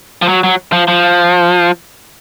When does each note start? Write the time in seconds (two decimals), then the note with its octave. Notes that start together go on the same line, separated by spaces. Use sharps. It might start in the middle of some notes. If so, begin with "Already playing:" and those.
0.22 F3
0.29 F#3
0.44 F#3
0.72 F3
0.88 F3